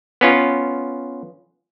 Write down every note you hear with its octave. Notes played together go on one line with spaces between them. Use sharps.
B3 C#4 F4